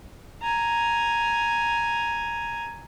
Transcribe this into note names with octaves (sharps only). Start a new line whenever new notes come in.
G#5 A#5